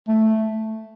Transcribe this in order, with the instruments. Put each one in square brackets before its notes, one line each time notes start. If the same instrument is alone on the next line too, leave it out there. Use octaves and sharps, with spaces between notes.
[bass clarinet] A3